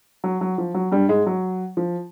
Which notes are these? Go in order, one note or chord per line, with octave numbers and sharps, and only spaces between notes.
F#3
F#3
F3
F#3
G2 G3
G#2 G#3
F#3
F3